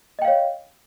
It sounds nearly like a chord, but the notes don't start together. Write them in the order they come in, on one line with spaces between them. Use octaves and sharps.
D#5 G5 F5 C#5